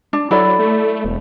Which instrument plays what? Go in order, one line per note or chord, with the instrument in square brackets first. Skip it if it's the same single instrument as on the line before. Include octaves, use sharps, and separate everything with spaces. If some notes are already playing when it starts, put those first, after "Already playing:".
[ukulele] D4
[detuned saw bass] F#3 [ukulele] E4 A4 D5
[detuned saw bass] A3
E1